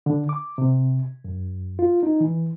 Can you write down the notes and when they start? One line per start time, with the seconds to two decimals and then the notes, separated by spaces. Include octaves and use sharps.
0.06 D3
0.29 D6
0.58 C3
1.25 F#2
1.79 F4
2.03 D#4
2.20 E3